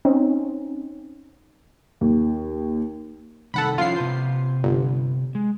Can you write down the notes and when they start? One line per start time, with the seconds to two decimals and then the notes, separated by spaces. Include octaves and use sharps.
0.05 C4 C#4 D#4
2.01 D#2
3.54 C2 D#3 A4 F#5 B5
3.78 F3 C#4 E4 F4 C7
3.96 C3 B4 C5
4.64 G1
5.35 G#3